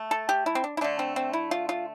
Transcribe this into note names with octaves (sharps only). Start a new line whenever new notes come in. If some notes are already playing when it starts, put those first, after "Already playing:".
Already playing: A3
A4
G4
E4
C4
D4
E4
D3 A3 D4
C4
C4
E4
F4
F4